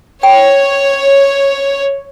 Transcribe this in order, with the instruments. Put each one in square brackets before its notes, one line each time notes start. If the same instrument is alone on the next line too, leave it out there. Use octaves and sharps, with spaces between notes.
[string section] C#5 [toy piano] G5